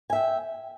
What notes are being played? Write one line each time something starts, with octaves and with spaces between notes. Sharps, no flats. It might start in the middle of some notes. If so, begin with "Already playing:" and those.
E5 G5 G#5